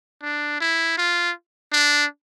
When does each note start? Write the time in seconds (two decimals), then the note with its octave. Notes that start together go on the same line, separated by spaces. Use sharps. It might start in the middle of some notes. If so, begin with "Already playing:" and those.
0.23 D4
0.61 E4
0.98 F4
1.72 D4